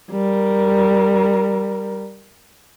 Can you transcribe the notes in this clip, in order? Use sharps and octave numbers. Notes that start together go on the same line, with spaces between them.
G3 A#4